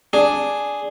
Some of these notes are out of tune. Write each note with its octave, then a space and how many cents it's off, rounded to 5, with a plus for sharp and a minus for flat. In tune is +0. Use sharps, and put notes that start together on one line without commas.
D4 +0 G#4 +0